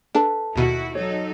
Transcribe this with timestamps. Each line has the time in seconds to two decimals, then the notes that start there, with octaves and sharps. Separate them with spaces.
0.15 D4 A4 B4 A5
0.56 D#2 B2 E4 F#4
0.95 F#3 D#4 A4 C#5